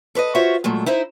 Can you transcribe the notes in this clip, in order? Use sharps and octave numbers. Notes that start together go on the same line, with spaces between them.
A4 B4 C#5 D#5
F4 F#4 C5 C#5 E5 F5
A#2 F#3 G#3 A3
D#4 E4 C5 E5